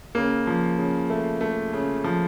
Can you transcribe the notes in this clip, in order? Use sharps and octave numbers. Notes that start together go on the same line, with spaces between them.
C#3 A#3
F3
C#3
A3
A3
C#3
F3